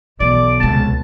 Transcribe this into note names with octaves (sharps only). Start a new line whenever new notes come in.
B1 E3 D5
C#2 C3 A5